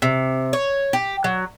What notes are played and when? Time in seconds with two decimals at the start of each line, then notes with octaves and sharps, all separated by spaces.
0.02 C3
0.53 C#5
0.93 G4
1.24 F#3